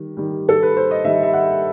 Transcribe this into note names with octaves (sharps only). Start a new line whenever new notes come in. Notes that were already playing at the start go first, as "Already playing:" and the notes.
Already playing: D#3 G3
D#3 G3
A4
B4
C5
D#5
D#3 G3 E5
E5
F#5